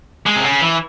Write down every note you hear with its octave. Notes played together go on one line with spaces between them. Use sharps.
G#3
C3
C#3
E3